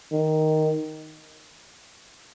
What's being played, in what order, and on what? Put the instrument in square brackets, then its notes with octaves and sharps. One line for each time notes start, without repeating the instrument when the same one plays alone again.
[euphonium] D#3